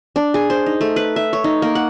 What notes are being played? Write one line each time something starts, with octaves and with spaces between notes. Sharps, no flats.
D4
G#4
C5
D#4
A3
B4
E5
C#5
D#4
A#3
F#5